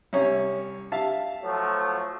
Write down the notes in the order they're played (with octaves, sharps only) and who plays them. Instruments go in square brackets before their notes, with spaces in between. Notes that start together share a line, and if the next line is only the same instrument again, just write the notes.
[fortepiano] C2 C#4 E5
E5 F5 A5
[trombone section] F3 F#3 A3